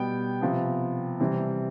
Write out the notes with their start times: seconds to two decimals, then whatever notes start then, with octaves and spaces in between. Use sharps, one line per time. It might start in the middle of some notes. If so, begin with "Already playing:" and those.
Already playing: B2 G3 B3 G5
0.41 C3 F3 B3
1.20 C3 E3 G3 C4